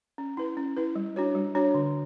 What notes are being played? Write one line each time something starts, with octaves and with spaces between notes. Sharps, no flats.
C#4
E4 B4
C#4
E4 B4
G3
D4 F#4 C#5
G3
D4 F#4 C#5
D3